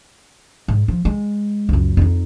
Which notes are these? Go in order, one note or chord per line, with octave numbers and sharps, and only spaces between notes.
G#2
F3
G#3
C#2 F#2
F2 D#4